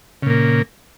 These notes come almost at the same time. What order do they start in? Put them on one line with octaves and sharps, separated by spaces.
C#3 A#2 A#3